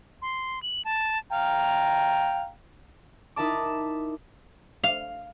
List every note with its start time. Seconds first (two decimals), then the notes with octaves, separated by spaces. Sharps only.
0.22 C6
0.63 F#7
0.85 A5
1.31 F5 G5 A#5
3.36 D#4 E4 A#4 E5 A5 D6
4.84 F5